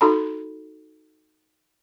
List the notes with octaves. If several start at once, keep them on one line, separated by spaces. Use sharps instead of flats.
D#4 F#4 A4 A#5 B5